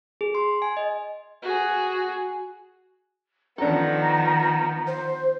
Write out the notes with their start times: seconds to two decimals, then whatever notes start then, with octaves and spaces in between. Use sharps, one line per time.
0.21 G#4
0.35 C6
0.62 G#5
0.77 D#5
1.42 F#4 G#4
3.58 D#3 F3 B3 D4 A4 A#5
4.87 C5